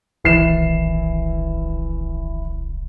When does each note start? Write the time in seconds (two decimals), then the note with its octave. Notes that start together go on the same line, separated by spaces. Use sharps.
0.25 D1 B1 D#3 E3 C7 E7